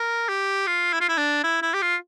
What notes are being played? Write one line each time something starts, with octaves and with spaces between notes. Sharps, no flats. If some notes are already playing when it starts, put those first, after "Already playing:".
Already playing: A#4
G4
F4
E4
F4
E4
D4
E4
E4
G4
F4